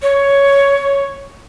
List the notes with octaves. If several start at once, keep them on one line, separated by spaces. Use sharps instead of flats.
C#5